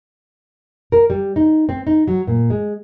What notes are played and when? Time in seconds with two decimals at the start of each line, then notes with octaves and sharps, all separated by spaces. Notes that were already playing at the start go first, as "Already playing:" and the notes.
0.92 A#4
1.10 G3
1.36 D#4
1.69 C4
1.87 D#4
2.07 F#3
2.27 A#2
2.50 G#3